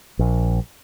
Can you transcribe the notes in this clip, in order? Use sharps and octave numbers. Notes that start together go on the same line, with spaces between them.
A#1